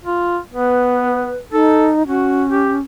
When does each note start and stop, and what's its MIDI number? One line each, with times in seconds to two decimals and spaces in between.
0.04 0.38 65
0.53 1.33 59
0.53 1.36 71
1.52 2.03 63
1.52 1.89 69
2.07 2.80 61
2.07 2.43 66
2.50 2.75 67